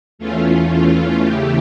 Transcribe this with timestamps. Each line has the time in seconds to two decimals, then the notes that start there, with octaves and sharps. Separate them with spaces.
0.19 E2 E3 A3 C#4 F4
0.72 F4
1.23 E2 C#3 E3 A3 G4